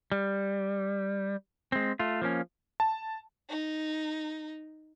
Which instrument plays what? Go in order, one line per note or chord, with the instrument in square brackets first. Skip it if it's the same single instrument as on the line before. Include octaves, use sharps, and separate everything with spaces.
[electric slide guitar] G3
G#3 C4
A3 F4
F3 A#3 C#4
[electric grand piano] A5
[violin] D#4